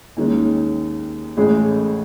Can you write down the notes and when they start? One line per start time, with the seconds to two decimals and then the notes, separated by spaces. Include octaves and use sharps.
0.17 D#2 D#3 G#3 C#4
1.37 A1 A2 G#3 C#4 G#4